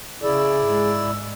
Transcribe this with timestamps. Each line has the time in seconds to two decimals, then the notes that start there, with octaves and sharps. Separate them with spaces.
0.23 C#3 E4 G#4 D5 E6
0.65 G#2 G#3